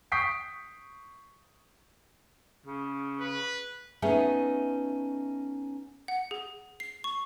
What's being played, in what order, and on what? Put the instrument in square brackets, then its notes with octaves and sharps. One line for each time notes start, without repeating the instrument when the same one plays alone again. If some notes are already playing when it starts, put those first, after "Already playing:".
[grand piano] C#6 D#6 G6 B6 C7 D7
[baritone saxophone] C#3
[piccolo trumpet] B4
[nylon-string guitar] A3 B3 C#4 D#4 G#4
[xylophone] F#5
G#4
C7
C#6